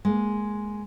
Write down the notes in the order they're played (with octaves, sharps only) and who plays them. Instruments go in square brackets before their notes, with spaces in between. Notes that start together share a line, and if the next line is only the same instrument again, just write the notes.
[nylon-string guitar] G#3 A#3